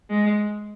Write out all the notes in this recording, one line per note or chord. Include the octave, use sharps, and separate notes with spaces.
G#3